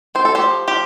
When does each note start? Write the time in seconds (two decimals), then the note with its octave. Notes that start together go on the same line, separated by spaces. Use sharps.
0.15 C4 C5
0.25 A4
0.35 G4 C5
0.41 F3
0.68 F3 G4